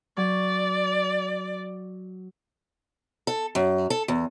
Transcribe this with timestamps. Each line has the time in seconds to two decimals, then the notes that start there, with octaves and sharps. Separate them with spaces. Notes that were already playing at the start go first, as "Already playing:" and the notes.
0.17 F#3 D5
3.27 A4
3.55 F#2
3.90 A4
4.08 E2